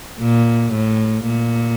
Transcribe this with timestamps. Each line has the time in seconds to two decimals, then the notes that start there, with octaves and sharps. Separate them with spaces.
0.20 A#2
0.73 A2
1.26 A#2